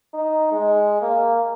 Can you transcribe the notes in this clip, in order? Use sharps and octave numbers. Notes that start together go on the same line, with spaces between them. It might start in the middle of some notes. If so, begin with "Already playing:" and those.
D#4
G#3
A#3